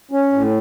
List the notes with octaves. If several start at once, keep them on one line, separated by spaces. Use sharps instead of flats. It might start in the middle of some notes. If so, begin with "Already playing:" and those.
C#4
A2